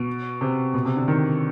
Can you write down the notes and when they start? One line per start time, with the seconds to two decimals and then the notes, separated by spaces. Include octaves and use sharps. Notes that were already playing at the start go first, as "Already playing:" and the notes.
Already playing: B2
0.41 C3
0.74 B2
0.85 C3
0.96 D3
1.08 D#3